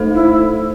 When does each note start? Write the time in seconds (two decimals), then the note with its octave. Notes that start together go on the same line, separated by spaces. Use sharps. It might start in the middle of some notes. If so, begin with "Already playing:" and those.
Already playing: A3 D#4 A4 C5
0.14 E4